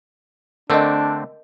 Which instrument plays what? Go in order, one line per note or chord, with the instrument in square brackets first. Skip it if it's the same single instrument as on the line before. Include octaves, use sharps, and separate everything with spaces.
[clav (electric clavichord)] D3 A3 C4 [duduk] D4 [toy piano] A#4 D#5